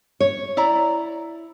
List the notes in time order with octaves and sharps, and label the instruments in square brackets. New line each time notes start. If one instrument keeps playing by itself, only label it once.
[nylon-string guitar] C#5
[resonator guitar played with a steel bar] E4 D5 A#5